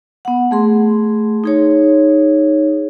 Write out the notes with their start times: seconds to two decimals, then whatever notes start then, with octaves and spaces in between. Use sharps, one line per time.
0.25 B3 F#5
0.51 A3 G#4 C6
1.44 D#4 G#4 C#5